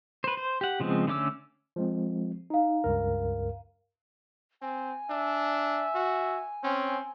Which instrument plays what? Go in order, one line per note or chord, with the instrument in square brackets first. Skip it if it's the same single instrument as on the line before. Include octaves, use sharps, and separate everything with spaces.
[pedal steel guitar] B4 C5
C5
G4 F#5
C#3 F3 G#3 B3 C4
D3 A3 C#4 D6 E6
[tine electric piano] F3 G#3 C4
[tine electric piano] D#4 [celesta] F5 A#5
[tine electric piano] C#2 G2 A#4
[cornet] C4 [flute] G#5
[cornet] D4 [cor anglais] E5
[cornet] F#4
[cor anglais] C4 [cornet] C#4